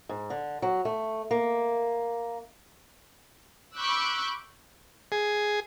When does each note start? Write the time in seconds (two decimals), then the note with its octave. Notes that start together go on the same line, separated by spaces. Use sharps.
0.09 G#2
0.30 D3
0.62 F#3
0.85 A3
1.31 A#3
3.77 B5 C#6 D6 E6 F#6 G6
5.12 G#4